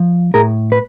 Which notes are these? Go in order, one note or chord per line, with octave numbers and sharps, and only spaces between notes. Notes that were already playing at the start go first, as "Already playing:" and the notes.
Already playing: F3
A2 G#4 A#4
B4